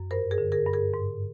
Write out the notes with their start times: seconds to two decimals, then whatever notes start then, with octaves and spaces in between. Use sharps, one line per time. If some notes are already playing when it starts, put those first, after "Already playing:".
Already playing: F#2
0.11 G2 A#4 C5
0.31 G#4 A#4
0.38 D3
0.52 G#4 A#4
0.67 G2
0.73 G#4 A#4
0.94 G#2